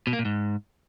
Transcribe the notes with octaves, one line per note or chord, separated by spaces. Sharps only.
B2
A#3
A#2
G#2